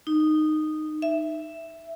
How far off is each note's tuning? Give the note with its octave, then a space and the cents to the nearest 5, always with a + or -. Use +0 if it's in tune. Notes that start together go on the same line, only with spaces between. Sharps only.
D#4 -10
E5 +5